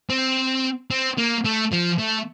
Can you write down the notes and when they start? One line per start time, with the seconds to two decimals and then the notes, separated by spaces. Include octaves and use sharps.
0.10 C4
0.91 C4
1.18 A#3
1.44 A3
1.72 F3
1.98 A3